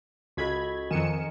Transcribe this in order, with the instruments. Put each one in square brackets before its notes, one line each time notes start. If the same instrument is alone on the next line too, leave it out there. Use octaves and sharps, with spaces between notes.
[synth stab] C#2 B5 G#6 [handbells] F#4 A4 D#5
[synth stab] F2 C#7 E7 [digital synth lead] D#3 [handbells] G#5